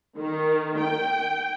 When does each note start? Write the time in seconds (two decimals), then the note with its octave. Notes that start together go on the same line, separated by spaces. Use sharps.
0.18 D#3
0.80 G5